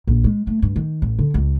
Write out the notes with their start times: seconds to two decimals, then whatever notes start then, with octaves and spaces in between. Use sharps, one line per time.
0.07 A#1
0.24 G#3
0.47 A3
0.62 G2
0.76 D#3
1.02 A1
1.19 D3
1.34 C#2